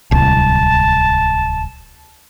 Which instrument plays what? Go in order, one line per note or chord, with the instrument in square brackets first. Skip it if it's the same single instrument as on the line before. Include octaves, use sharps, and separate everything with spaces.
[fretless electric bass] D1 C2 [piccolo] A5